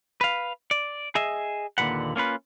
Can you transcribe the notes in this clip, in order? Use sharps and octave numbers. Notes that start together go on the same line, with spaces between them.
B4 F5
D5
G#4 D#5 E5
D#2 A#2 D3 F#3 B4 F#5
A#3 C#4 F4 B4